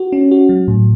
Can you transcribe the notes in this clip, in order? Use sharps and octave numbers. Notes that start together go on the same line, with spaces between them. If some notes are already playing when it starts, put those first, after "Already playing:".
Already playing: F#4
C#4
F#4
F#3
A2